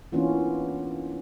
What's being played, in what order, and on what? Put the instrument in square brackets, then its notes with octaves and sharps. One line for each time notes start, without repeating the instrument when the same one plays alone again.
[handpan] E3 A#3 B3 C#4 D4 F4